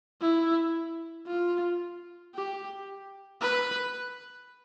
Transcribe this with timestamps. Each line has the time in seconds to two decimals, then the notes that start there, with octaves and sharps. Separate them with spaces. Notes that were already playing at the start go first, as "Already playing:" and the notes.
0.21 E4
1.27 F4
2.35 G4
3.41 B4